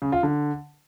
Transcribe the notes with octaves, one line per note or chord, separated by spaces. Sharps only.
C#3
F4
D3